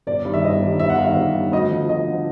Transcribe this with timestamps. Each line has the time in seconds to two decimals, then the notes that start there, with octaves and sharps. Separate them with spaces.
0.07 G1 D5
0.25 G2 D#3
0.33 E5
0.44 G1 D#5
0.62 G2 D#3
0.79 G1 E5
0.90 F#5
0.98 G2 F5
1.03 D#3 E5
1.16 G1
1.34 G2 D#3
1.52 D2 D#5
1.71 D3 F3
1.89 D2 D#5
2.07 D3 F3